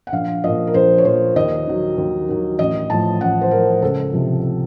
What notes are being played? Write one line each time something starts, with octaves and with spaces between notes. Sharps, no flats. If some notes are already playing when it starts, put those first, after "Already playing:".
F#5
A#1 F5
A#2 F3 D#5
A#4
A#1 C5
C#5
A#2 F3 C5
D#2 D#5
D#3 F#3
D#2
D#3 F#3
A1 D#5
A2 F3 A5
A1 F#5
C5
A2 F3 A#4
C#2 A4
C3 F3